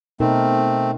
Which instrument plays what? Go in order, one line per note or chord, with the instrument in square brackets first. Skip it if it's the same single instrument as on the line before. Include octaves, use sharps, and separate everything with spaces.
[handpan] B2 D#4 A#4 [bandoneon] A3 C4